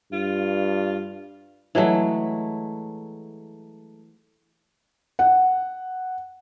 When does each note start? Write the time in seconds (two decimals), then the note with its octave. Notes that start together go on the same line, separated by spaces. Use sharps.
0.13 G2 F4
1.75 E3 F#3 G#3 A3
5.19 F#5